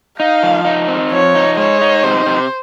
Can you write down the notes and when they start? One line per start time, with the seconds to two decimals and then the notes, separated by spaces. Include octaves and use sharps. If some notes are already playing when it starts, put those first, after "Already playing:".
0.19 D#4 F5
0.42 F3
0.65 D#4
0.88 C4
1.11 F3 C#5
1.35 D#4
1.57 G#3 C#5
1.81 D#4
2.03 C3 C5
2.26 C3